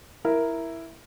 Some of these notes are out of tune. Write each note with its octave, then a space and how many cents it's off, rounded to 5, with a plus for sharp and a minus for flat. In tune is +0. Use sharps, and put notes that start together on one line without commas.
E4 +0 A#4 +0